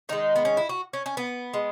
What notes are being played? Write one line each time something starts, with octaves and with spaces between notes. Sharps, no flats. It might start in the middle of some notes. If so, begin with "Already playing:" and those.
D#3 G#3 D#4
B3
C#4
E4
F#4
C#4
C#4
B3
G#3